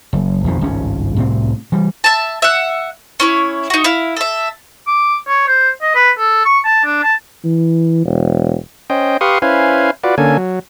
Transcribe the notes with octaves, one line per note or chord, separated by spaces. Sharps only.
F#1
G#1 F2 B2 D#3
G#1 C#2 G2 C#4
C2 A2 G#3 C4
E3 G3
E5 A5
E5 F#5
C#4 E4 C#5
D#4 F#4
E4 F5
A4 E5
D6
C#5
C5
D#5
B4
A4
C#6
A5
D4
A5
E3
E1
C#4 C5 D#5 G5
G4 B4 F5 C6 C#6 D#6
C#4 E4 B4 C5 F5 G#5
F4 F#4 B4 D5
D3 A#3 C#4 A4 G#5
F#3